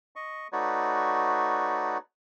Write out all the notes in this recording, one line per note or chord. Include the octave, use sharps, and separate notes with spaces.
D#5 C#6
A3 D#4 F#4 B4 C#5 D5